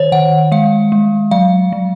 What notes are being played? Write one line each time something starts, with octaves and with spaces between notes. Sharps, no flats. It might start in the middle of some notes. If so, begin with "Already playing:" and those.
Already playing: D#3 C5 C#5
D#3 F#5
G#3 F5
G#3
F#3 F5
F#3